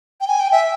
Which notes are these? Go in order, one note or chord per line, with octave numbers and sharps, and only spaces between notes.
G5
G#5
G5
E5